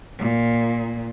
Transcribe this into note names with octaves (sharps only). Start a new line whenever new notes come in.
A#2